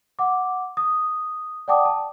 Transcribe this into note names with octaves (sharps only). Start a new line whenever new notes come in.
F#5 D6
D#6
D5 F#5 G5 A5 D6 D#6
A5